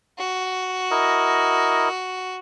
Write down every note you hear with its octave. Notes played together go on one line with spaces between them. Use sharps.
F#4
E4 A#4 D#5